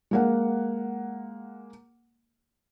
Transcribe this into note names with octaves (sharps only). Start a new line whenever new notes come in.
G#3 A#3 F#5